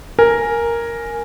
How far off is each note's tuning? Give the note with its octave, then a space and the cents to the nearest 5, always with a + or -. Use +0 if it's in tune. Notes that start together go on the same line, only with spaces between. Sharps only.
A#4 +0 G#5 +0